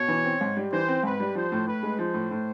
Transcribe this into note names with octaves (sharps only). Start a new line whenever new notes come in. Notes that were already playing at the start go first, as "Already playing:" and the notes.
Already playing: B2 C#5
E3
C4
G#2
G3
E3 C5
C4
G#2 B4
G3
F3 C5
A2
A2 B4
G#3
F3 C5
A2
A2